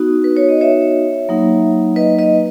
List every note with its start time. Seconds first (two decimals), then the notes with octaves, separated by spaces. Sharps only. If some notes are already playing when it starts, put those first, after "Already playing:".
Already playing: B3 D#4 F#4
0.24 B4
0.37 C#5
0.49 D#5
0.61 C#5 E5
1.29 F#3 A#3 D#4
1.96 B4 D#5
2.19 B4 D#5